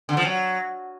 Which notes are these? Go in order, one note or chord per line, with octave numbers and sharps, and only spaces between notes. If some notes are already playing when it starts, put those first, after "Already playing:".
D3
F3
F#3